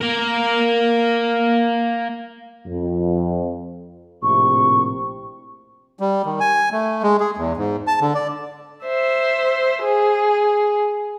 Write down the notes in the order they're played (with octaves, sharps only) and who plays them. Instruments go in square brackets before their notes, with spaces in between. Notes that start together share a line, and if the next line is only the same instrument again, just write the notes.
[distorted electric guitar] A#3 A#4
[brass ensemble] F2
[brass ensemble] A#1 A2 C3 [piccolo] C#6
[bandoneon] G3
D#3
G#5
A3
G#3
G#4
E2
G#2
A5
D3
D5
[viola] C5 E5
G#4